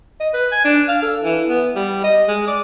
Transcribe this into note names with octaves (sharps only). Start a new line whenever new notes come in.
D#5
B4
G#5
D4
F5
A4
E3
B3
G3
D#5
G#3
D5